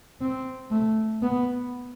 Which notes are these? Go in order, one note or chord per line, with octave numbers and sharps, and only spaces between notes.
C4
A3
B3